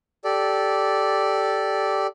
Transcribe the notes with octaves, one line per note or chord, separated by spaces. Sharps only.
G4 A4 D5